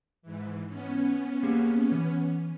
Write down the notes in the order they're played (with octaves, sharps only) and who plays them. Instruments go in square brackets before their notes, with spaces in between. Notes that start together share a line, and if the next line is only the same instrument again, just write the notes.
[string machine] G#2 E3
B3 C#4
[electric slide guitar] A#3 G4 G#4
E3